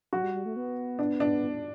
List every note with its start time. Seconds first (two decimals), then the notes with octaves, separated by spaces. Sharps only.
0.13 F#3 F#4
0.23 G3
0.34 G3
0.46 A3
0.56 B3
0.99 D4
1.20 D4